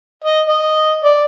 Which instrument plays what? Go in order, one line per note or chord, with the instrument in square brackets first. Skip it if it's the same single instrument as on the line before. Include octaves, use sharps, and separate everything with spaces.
[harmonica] D#5
D#5
D5